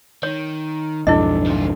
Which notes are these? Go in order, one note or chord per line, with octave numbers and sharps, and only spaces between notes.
D#3 C#5
B1 F2 G#2 D4 E4 A4 D#5
D#3 F4